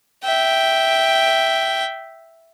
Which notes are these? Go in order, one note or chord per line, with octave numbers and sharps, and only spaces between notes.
E5 G5